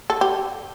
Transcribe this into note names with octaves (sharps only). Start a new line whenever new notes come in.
A4
G4